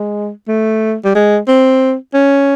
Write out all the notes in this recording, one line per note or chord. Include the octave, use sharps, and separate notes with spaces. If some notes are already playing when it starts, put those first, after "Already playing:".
Already playing: G#3
A3
G3
G#3
C4
C#4